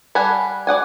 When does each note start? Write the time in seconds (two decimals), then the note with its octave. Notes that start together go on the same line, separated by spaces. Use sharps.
0.15 G3 F#5 G#5 A5 B5
0.67 D5 D#5 F#5 G#5